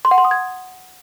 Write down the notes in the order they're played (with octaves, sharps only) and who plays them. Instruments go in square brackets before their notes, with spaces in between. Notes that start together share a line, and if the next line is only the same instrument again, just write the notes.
[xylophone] C6
F#5
C6
D#6
G#6